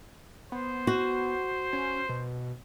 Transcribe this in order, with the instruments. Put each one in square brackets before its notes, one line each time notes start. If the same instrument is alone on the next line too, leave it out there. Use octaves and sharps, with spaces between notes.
[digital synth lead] B3 [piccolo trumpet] C5
[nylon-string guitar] F#4
[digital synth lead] C#4
B2